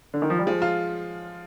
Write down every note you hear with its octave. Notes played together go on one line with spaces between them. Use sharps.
D3
D#3
F3
G3
F3 G#3
F4